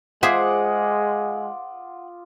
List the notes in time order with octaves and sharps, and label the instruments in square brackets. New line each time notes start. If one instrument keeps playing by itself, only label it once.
[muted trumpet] G#3 [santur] F4 D6 D#6 [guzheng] G#4 C5 E5 [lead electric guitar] F#5